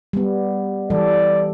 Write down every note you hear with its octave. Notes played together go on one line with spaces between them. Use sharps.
G3 B3
E3 G3 A4 D5